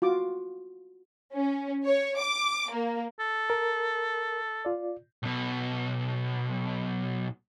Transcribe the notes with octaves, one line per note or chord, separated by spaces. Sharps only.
F4 F#4 D6
C#4
C#5
D6
A#3
A4
A#4
F4 D5
B1 B2